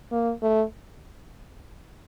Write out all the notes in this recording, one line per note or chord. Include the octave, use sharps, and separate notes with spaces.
A#3
A3